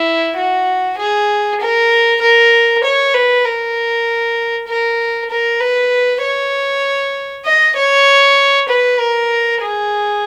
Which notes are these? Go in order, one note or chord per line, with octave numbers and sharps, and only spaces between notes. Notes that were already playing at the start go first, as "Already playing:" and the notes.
Already playing: E4
F#4
G#4
A#4
A#4
C#5
B4
A#4
A#4
A#4
B4
C#5
D#5
C#5
B4
A#4
G#4